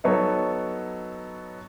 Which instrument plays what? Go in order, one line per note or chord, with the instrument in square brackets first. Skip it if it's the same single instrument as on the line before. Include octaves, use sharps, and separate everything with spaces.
[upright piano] F#3 B3 D#4 A4 C#5